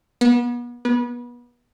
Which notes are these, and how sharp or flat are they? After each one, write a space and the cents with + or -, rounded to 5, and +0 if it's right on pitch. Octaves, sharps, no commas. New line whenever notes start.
B3 -35
B3 -30